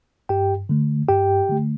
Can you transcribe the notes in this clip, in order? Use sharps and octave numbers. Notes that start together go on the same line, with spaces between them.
G2 G4 G5
D3 A3
G2 G4 G5
D3 A3